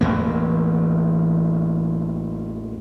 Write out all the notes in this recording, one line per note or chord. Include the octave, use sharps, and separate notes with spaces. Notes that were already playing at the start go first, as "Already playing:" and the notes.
A1 E2 A#3